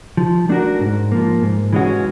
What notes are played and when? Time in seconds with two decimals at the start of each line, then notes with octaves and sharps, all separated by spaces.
0.17 F3
0.49 A3 D4 F#4 A#4
0.81 G#2
1.12 F3 A#3
1.42 G#2
1.73 E3 G#3 C#4 F#4